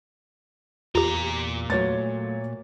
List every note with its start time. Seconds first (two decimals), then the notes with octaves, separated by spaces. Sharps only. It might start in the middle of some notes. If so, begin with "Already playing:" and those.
0.95 E2 A#2 F4 G4 A#5
1.70 F#3 A3 C#5 A6